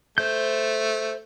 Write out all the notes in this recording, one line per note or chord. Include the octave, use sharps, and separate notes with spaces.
A3 C5 G6